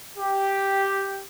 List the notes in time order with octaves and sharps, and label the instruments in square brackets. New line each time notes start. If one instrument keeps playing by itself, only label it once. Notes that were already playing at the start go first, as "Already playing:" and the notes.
[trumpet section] G4